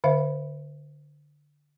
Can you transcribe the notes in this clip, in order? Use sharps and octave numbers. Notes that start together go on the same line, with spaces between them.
D3 C5 E5 F5